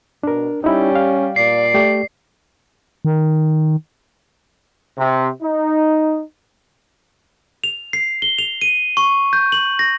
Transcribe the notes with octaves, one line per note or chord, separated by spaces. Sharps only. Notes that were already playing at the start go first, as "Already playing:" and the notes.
B2 D4 A#4
G3 C#4 D#4 E4
F5
A#2 D5 C7
A3 G4
D#3
C3
D#4
F7
C7
G7
F7
D#7
C#6
G6
F#7
A#6